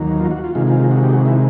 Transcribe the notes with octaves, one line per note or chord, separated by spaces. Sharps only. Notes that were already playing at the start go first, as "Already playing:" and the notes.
Already playing: D#2 D#3 F#3 A#3
F4
F#4
F4
C3 D#3 G#3 F4
F4
F4
F#4
G4
F#4
E4